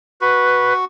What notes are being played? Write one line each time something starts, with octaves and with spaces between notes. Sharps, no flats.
F#4 B4